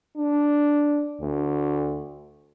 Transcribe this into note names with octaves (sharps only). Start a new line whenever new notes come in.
D4
D2